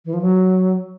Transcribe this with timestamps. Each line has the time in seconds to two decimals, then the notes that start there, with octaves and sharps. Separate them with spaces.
0.05 E3
0.14 F3
0.21 F#3